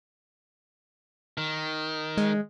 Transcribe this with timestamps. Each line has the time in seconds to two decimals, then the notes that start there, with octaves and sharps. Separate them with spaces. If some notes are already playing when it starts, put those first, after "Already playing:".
1.38 D#3
2.17 G#3